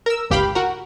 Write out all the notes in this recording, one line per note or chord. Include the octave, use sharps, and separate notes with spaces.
A#4 E6
G1 C#2 G4 F5 G5 B5
F#4 A#4